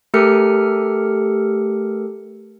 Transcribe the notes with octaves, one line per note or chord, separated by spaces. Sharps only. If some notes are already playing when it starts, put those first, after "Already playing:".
A3 G4 A4 A#4 F6 C#7